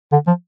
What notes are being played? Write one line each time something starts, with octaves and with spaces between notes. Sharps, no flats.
D3
F3